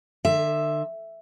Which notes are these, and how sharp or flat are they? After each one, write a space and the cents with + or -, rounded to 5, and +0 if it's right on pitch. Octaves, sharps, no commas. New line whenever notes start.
D3 +40 E5 +5